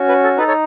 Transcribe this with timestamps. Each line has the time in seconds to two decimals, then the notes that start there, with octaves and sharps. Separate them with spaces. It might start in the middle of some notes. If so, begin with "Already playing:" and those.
Already playing: C#4 F#4
0.09 B4
0.24 A4
0.37 D#4 A4 B4
0.48 A4 C#5